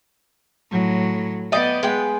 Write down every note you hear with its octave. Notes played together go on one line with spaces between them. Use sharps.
A2 F#3
B3 D5 D#5 G5
G#3 G5